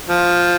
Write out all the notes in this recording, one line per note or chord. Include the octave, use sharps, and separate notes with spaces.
F3